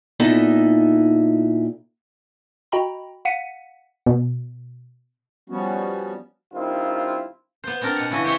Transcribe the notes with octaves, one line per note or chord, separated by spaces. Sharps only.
A#2 B3 D#4 E4 A4 D#5
F#4 D#5 G5 A#5 B5
F5 F#5 B6 C#7 D#7
B2
F3 G3 B3 C#4 F#4
G2 D#3 C4 E4 F4
B3 C5
B3 C4 D4 A#4
B2 F#5
C#3 E3 E4 F#4 D#5
G4 C5 C#5 E5